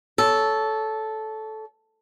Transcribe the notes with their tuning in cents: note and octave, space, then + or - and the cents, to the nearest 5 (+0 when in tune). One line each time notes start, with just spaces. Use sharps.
A4 -10 C#5 +20